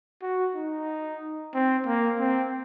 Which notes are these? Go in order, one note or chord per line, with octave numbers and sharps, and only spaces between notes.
F#4
D#4
C4
A#3
C4